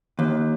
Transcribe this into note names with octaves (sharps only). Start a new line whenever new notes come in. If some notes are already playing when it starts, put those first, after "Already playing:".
D#2